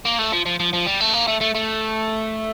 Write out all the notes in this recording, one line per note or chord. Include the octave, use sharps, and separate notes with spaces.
A#3
A3
F3
F3
F3
F3
G3
A3
A#3
A3
A3
A3